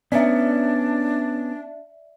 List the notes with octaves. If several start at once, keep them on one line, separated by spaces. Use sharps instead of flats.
B3 C#4 D4 D5 E5